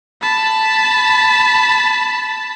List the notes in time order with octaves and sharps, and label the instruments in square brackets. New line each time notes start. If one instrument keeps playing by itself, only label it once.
[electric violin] A5 B5